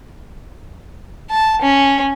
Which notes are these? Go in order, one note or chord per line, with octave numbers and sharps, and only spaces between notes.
A5
C#4